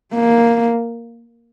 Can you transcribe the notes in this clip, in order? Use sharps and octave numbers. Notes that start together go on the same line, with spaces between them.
A#3